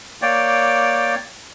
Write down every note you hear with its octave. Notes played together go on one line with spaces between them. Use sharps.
A#3 C#5 D5 G5